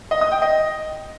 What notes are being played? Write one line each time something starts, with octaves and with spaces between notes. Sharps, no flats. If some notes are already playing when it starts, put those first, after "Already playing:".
D#5
D#6
G5
D#5